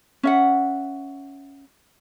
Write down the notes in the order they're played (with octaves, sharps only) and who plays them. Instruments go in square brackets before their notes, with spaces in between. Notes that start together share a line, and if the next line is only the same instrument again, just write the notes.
[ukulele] C#4 E5 F#5